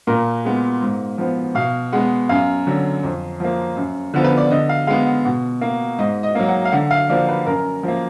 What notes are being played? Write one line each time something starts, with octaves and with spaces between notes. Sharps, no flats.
A#2 A#4
G#3 B3
G#2
F3 B3
B2 F5
G#3 B3 F#5
F#2 F5
D3 F#3
F2
F3 A#3
F#2
D3 F3 B3
B4
D5
D3 D#5
F5
G#3 B3 F5
F#5
B2 F#5
A#3
G#2 D#5
D#5
F#3 A#3
F#5
F5
D3 F#5
F5
F3 A#3 D5
B4
F#2 A#4
F3 A#3